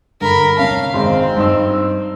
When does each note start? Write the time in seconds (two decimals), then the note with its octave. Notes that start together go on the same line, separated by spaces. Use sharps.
0.21 G2 D3 A#4 B5
0.57 C3 C#4 F5 A5
0.94 G#1 G#2 C4
1.37 G2 D#4 E6